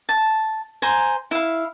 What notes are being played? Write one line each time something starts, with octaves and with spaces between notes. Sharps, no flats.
A5
C5 G#5 A#5
E4 F5